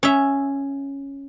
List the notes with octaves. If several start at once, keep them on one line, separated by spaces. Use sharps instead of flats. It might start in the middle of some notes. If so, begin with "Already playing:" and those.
C#4 E5